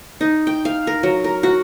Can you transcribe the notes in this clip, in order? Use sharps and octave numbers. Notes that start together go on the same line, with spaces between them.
D#4
G5
F5
A#4
F#3
A#4
F#4